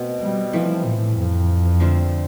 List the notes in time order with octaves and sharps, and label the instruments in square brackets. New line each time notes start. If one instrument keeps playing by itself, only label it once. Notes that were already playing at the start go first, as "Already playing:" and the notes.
Already playing: [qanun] B2 A3 C4
[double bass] G3
[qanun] E3 A3 C4 [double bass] F3
[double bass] A2
F2
[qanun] D3 A3 C4 F4